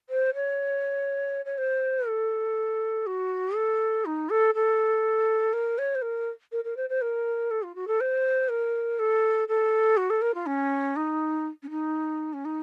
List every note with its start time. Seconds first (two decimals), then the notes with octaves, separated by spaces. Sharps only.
0.09 C5
0.34 C#5
1.45 C#5
1.57 C5
2.07 A4
3.06 F#4
3.55 A4
4.05 D#4
4.29 A4
4.54 A4
5.53 A#4
5.78 C#5
5.95 C5
6.01 A#4
6.52 A#4
6.64 A#4
6.76 C5
6.89 C5
7.01 A#4
7.50 A4
7.62 F4
7.75 F#4
7.87 A4
8.00 C5
8.48 A#4
8.99 A4
9.48 A4
9.97 F#4
10.10 A4
10.21 A#4
10.34 F4
10.46 C#4
10.96 D#4
11.62 C#4
11.69 D#4
12.33 C#4
12.45 D#4